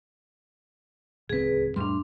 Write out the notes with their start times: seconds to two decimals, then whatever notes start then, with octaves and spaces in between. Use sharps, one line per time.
1.29 D1 C#2 C4 G#4 B4
1.76 F2 A2 G3 D4 C6